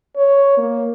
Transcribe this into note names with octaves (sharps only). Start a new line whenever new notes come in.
C#5
A#3